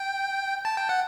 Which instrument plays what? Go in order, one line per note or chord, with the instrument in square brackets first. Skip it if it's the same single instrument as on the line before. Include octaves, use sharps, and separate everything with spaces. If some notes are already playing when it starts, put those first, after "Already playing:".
Already playing: [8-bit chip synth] G5
A5
G5
F#5